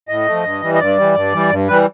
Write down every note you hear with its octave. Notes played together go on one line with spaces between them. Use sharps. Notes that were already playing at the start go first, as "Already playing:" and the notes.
A2 D#5
F3 A3
G2
E3 G3
D#5
G2 D5
E3 G3
G2
E3 G3
G2
E3 G3 B4